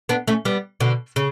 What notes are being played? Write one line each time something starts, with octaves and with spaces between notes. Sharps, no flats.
B3 D4
A3 C#4
G3 B3
B2 D3
C#3